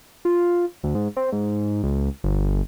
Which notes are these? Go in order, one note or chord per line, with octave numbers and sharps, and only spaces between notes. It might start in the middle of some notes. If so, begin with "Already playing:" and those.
F4
D2
G#2
C4
G#2
C#2
G1